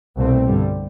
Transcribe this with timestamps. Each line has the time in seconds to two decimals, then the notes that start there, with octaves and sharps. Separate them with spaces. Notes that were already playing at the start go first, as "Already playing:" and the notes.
0.17 C2 B2 A3 C4
0.46 G2 D3 G3